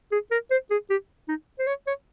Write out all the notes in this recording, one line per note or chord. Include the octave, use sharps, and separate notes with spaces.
G#4
A#4
C5
G#4
G4
D#4
C5
C#5
C#5